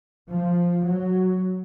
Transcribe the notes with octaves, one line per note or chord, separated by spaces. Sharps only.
F3
F#3